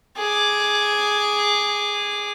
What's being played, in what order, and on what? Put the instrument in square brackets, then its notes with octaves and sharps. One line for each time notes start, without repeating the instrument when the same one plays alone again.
[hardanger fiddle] G#4 D6